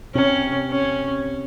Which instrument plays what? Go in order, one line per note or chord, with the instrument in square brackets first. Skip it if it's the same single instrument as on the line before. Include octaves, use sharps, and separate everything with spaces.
[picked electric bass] C3 [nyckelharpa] C#4
[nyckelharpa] C#4